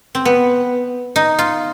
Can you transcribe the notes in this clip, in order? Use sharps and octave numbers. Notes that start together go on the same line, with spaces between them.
C4
B3
D#4
F4